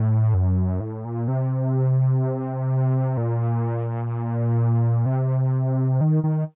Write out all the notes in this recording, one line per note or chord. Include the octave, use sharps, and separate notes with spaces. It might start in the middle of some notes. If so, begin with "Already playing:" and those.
Already playing: A2
F#2
A2
A#2
C3
A#2
C3
D#3
D#3